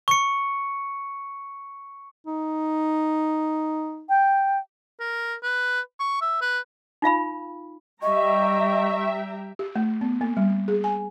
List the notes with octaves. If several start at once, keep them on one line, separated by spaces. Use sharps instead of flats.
C#6 C#7
D#4
G5
A#4
B4
C#6
E5
B4
D#4 F4 F5 B5
G3 D#5 E5 G5 A#5 C#6
G4
A3
B3
A#3
G3
G#4
G#5